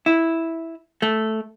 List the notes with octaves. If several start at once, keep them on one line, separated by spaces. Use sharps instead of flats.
E4
A3